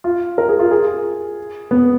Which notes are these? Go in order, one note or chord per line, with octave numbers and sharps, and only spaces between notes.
F4
A#4
G#4
F4
G#4
B3